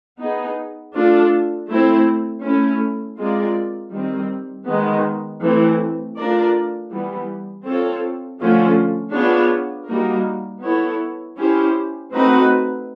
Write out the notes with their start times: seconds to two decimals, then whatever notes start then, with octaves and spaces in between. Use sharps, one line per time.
0.20 B3 D#4 G#4
0.95 A3 D4 F4 A4
1.69 A3 C4 E4
2.43 A3 C#4 E4
3.18 G#3 C4 F4 A#4 D5
3.92 D#3 G3 C4
4.66 D#3 G#3 B3
5.42 E3 A3 C4
6.16 A3 D4 F4 A#4 D5
6.90 E3 G3 B3
7.65 C4 F4 A4 C#5
8.39 D3 F3 A3 C#4 F4
9.13 B3 D4 F4 G#4 C#5
9.87 G3 A#3 D#4 F#4 A#4
10.62 B3 E4 A4 C#5
11.37 C#4 E4 G4 C5
12.11 A3 C4 D#4 F#4 B4